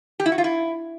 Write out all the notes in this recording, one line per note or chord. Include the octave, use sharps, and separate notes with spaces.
G4
E4
F#4
F4
E4